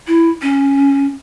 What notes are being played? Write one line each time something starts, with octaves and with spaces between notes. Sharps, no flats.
E4
C#4